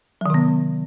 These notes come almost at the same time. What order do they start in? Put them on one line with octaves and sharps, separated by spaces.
F#3 D#3 C3 B3